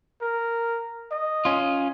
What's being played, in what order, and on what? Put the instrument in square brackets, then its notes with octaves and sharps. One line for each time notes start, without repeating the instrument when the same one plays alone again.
[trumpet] A#4
D#5
[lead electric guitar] C#4 F4